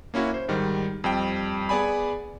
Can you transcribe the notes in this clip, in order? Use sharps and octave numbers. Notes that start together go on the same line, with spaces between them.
A#3 C#4 E4 F#4
C5
G#2 D#3 G3
F2 G3 G5
B3 G#4 D5 G#5 B5